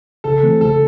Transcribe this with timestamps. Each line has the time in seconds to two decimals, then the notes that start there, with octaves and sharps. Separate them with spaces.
0.24 C#3 A4
0.43 E3 A3 C4
0.61 C#3 A4